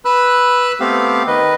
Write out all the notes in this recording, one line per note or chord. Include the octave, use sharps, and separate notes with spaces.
B4 B5 E6 F#6
A3 B3 C4 G4 F5
D#3 B4 D#5